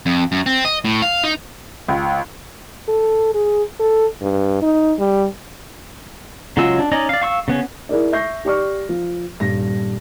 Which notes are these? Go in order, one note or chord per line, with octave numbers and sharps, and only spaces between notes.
F2
F#2
C4
D#5
A2
F5
D#4
C#2
A4
G#4
A4
G2
D#4
G3
C#3 F#3 G#3 F4 E6
D4
C#4 D#4 D5 D#5
D5 F5
F5 C#6 E6
C#3 B3 C#4
E4 G#4 A#4 D5
E5 C#6 G6 A#6 C7
G4 D5 C#6 F6
F3
D#1 G2 A#6